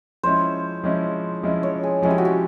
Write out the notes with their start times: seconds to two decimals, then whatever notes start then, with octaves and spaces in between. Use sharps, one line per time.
0.23 F3 G#3 C#4 E4 C5
0.83 F3 G#3 C#4 E4
1.43 F3 G#3 C#4 E4
1.63 C#5
1.83 G#4
2.02 F3 G#3 C#4 E4 G#4
2.11 G4
2.18 F#4
2.25 G4